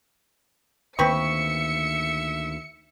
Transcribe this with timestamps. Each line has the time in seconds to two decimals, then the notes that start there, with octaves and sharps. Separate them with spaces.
0.99 D2 D#3 A#3 C4 B4 E5 C#6 C#7